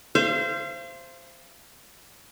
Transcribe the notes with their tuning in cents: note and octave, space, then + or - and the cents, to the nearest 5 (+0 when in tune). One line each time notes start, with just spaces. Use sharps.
C5 +0 F5 -40